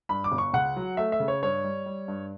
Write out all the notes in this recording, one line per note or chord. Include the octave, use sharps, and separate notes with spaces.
G2 B5
D6
G1
C#6
C#2 F#5
F#3
A3 E5
E5
C#3
C#5
G2 C#5
G3
G3
G2